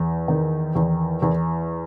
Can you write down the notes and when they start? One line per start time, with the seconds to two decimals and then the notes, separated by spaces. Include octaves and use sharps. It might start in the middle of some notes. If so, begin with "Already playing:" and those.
Already playing: E2
0.28 D#3
0.75 E2
1.22 E2